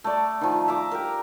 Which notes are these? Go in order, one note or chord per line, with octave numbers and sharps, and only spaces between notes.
A3 D5
D#3 F3
E5 A#5 D6
G4 A#4